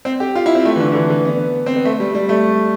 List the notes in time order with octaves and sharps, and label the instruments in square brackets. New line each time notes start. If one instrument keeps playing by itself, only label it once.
[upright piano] C4
G4
F4
E4
C4
A3
E3
D3
D3
E3
E3
B3
C4
B3
A3
G3
G3
A3